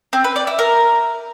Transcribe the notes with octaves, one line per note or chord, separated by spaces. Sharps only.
C4
B4
D5
E4
A#4